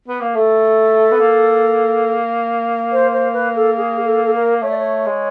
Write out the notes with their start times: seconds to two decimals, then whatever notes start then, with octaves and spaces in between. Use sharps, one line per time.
0.08 B3
0.21 A#3
0.35 A3 A4
1.12 B3
1.20 A#3
2.92 C5
3.13 C5
3.34 B4
3.56 A4
3.77 G#4
4.05 A4
4.25 A4
4.34 A#4
4.62 A3 C#5
4.71 D5
4.78 C#5
5.06 G#3